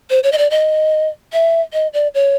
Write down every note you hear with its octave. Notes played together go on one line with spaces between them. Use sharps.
C5
C#5
D#5
D5
D#5
E5
D#5
D5
C#5